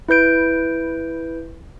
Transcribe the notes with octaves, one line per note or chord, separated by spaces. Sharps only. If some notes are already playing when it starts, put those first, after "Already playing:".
E4 B4 G6 D7